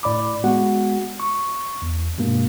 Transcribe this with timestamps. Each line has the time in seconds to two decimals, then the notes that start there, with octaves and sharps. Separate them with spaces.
0.03 A2 D5 B5 D6
0.44 G#3 B3 F#4 F#5
1.20 C#6
1.82 E2
2.18 G2 B2 G#3 A#3